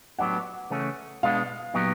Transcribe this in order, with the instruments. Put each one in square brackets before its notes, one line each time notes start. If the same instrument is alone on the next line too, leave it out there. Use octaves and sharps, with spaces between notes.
[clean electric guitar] A2 F#3 B3 D4 G4 [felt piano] F#5
[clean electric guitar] C#3 E3 A3 C#4
[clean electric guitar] B2 G#3 B3 D4 [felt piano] F5
[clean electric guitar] A#2 F#3 B3 D#4 G4